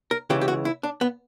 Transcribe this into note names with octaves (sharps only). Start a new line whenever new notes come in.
A#4
C#2 C#3 E3 G4
G4
F#4
E4
D4
B3